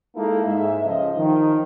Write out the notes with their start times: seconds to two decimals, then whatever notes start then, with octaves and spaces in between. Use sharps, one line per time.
0.16 G#3 A#3 D#4 E4 A4
0.45 G#2 E5
0.85 C#2 F3 D#5
1.16 D#3 F3